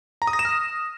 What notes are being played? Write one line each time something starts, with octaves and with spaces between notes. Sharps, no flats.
A#5
D#6
A#6
E7
F6